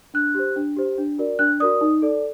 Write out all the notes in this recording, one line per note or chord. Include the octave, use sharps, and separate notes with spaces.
D4 F#6
G4 C5
D4
G4 C5
D4
F#4 A#4 D5
D4 F#6
F#4 A#4 D5 D#6
D#4
A4 D5